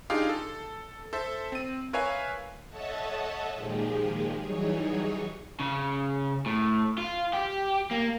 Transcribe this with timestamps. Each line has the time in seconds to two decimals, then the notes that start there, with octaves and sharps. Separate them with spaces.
0.10 D4 D#4 F4 G4 G#4 F5
0.29 A4
1.13 A4 C5 E5
1.52 C4 D#7
1.93 A#4 B4 C#5 E5 F5 G#5
2.69 A4 C#5 D#5 E5 F#5 A5
3.54 A#2 D#3 F3 G#3 G4 G#4
4.39 E3 F#3 G3 D#4 G#4 C#5
5.60 C#3
6.46 A2
6.98 F4
7.33 G4
7.91 A#3